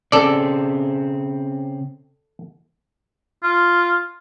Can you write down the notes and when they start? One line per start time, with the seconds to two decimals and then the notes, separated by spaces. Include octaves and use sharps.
0.12 C#3 C4 A4 D5
3.43 F4